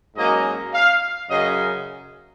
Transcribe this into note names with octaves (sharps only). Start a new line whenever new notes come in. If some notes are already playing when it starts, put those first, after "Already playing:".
G#2 F#3 A#3 C#4 D#5
F5
F#2 C#3 F#3 D#5